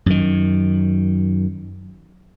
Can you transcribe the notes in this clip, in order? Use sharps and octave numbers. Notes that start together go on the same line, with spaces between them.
F#2 D#3